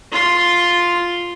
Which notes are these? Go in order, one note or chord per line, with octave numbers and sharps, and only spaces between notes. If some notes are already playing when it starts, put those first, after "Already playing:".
F4 C6